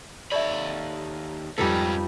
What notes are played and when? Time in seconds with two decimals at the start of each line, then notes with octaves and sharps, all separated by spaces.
0.32 D#2 A4 C#5 D5 E5 A5 B5
1.58 F2 G#2 G3 C#4 D#4 F4 A4 B4